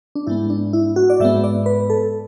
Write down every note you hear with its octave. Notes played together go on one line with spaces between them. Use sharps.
D4
G#2 G#3 B3 E4
D4
E4
F#4
D5
G#2 G#3 B3 E5
D5
B4
A4